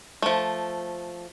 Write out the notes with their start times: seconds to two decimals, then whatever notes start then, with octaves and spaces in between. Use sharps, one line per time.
0.22 F3 A3